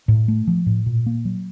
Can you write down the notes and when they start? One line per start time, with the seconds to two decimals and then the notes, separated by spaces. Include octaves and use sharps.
0.08 A2
0.28 A3
0.47 F3
0.66 A2
0.86 A#2
1.06 A#3
1.25 F#3